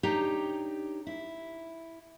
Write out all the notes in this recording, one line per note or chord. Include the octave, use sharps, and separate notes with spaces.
D4 D#4 G4 C#5 A#5
E4